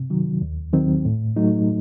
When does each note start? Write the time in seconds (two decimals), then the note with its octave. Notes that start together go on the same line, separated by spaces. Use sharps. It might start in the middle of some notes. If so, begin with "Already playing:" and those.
Already playing: C3
0.10 D#3 F#3
0.42 D#2
0.73 D#3 F#3 C4
1.05 A2
1.36 F#3 A3 D#4